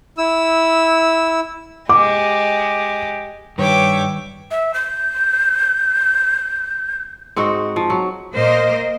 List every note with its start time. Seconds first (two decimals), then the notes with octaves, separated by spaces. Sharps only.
0.18 E4 E6
1.89 G#3 G4 D6
3.58 G2 D#3 G3 B4 C#5 E5 G5 D6
4.51 E5
4.74 G6
7.36 G#2 C4 D#4 F#4
7.76 F3
7.90 F#3
8.35 A#2 A#3 A#4 C5 D#5